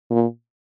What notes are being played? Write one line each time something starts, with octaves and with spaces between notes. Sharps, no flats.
A#2